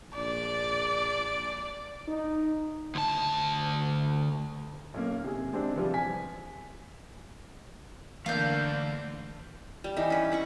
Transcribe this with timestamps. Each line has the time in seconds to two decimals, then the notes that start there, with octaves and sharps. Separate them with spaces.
0.16 A#1 D5
2.08 D#4
2.95 D2 A5
4.94 B1 F#2 A#3
5.24 C3 G#4
5.53 C3 G#3 C4 D4
5.74 C3 E3 F3 G3
5.94 G#5 B6
8.26 D3 E3 A3 A#3 D5 F5 G6
9.84 G3
9.97 E3 D#4
10.10 C#4 B4
10.31 E4 F#5 C#6